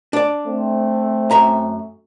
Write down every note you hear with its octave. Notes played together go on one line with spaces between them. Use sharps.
D4 D5
A3 C4
F#2 E5 A#5